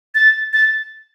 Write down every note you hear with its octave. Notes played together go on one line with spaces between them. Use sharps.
A6
A6